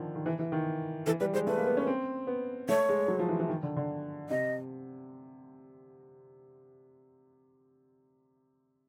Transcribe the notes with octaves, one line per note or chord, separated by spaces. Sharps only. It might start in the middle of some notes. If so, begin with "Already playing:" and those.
Already playing: D3 D#3 F3
D#3
E3
E3
D#3
E3 A4
G3 B4
G#3 C5
A3 B4
A#3
B3
C#4
C4
B3
A3 C#5
G#3
F#3
F3
E3
E3
D#3
D3
D3
C3 D#5